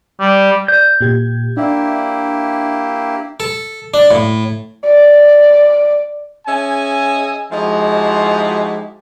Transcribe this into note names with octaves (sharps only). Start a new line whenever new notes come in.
G3
D5 G6
A#2 G4 G#6
A#3 D4 E4 G4 E5
A4
D4
A2
D5
C#4 G#4 D#5 E5 G#5
F3 G#3 D#4 E4 F#4 G4